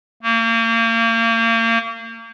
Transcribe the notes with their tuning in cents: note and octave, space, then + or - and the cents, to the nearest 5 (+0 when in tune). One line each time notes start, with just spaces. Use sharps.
A#3 -35